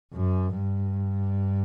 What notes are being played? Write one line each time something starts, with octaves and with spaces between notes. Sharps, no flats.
F#2
G2